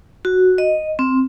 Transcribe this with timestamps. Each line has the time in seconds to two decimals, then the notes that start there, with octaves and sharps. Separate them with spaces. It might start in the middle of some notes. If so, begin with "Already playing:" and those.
0.25 F#4
0.58 D#5
0.99 C4